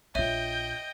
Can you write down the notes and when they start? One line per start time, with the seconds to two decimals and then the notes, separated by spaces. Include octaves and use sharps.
0.15 A#1 F4 C#5 D#5 E5 G5 G6 D#7